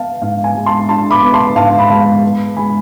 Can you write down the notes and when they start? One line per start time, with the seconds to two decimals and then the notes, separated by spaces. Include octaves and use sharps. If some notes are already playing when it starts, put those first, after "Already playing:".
Already playing: B3 F5 A5
0.22 G#2 F5
0.44 G#5
0.55 G#3
0.66 A5 C6
0.89 D4 A5 C6
1.11 B5 D6
1.22 B3
1.34 A5 C6
1.56 G#2 F5 A5
1.79 B5
1.90 G#3 F5 A5
2.23 B3
2.56 G#3 G#5 B5